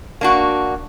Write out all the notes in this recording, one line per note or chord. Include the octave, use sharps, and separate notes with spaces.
A#3 D4 F#4